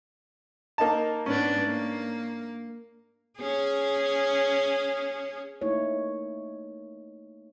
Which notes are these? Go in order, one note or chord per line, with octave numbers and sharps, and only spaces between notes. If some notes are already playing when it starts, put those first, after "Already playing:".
A#3 D#4 A5
G#2 B3 C#4 D4
A#3
C#4 G#4
A3 A#3 D#4 E4 C#5